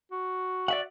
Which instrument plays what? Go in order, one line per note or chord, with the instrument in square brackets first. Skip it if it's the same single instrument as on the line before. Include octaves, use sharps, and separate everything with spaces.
[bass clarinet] F#4
[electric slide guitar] D5 E5 F#5